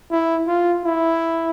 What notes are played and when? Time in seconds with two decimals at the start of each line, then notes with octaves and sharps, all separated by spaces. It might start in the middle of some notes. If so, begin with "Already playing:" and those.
0.11 E4
0.47 F4
0.84 E4